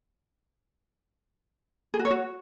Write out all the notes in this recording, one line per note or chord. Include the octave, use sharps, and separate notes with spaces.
G#4
F#4
C#5
F#4